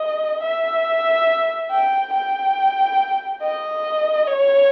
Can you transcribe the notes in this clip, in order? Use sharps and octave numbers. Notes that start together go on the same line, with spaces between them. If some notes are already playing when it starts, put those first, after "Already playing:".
Already playing: D#5
E5
G5
G5
D#5
C#5